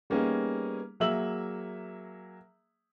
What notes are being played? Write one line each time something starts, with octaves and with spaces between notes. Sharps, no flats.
G3 A#3 B3 C#4 D#4 G#4
F#3 A#3 G#4 E5 E6 F#7